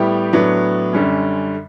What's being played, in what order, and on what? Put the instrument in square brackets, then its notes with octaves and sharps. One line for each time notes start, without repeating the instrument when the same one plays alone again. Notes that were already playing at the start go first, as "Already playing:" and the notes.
Already playing: [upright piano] A2 G3 B3 E4 G4
A2 F#3 B3 D4
F#2 D3 G3 C#4